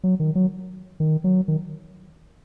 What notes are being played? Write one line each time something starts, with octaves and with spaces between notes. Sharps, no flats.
F#3
D#3
F#3
D#3
F#3
D#3